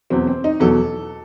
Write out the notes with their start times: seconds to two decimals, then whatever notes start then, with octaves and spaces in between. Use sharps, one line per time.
0.10 E2 B2 F#3 C4
0.27 C4
0.44 D#4
0.60 E2 B2 F#3 A4